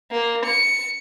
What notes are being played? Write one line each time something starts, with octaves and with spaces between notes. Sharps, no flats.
A#3
C#7